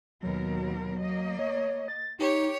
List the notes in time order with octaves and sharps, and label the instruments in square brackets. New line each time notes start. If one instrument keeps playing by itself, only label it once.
[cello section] D#2 B2 A#4 [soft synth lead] F#3
[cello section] A#3 D#5
[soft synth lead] C#5
A6
[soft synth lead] D#4 [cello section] G4 [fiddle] C#5